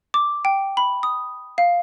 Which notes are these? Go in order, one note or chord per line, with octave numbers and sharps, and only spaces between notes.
D6
G5
B5
D#6
F5